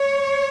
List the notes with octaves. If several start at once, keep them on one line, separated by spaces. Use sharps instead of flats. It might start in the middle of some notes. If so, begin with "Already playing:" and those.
Already playing: C#5